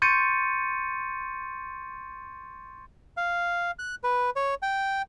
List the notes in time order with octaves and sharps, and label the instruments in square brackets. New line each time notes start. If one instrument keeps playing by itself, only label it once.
[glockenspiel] C6 C#6 G6 A6 C#7 D#7
[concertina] F5
F#6
B4
C#5
G5